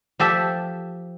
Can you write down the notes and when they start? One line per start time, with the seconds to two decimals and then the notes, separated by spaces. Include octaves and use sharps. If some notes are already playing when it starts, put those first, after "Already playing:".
0.19 F3 G4 A4 E5